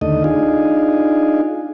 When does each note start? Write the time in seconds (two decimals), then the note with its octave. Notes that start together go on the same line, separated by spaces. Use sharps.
0.01 D#2 D3 A3 D#5
0.24 D4 D#4 F4 G#4